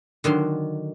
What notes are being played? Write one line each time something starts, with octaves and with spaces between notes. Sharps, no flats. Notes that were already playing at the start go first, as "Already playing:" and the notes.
D3 D#3 F#3 C6